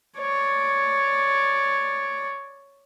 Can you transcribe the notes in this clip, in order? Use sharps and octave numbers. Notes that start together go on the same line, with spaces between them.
C#5 D5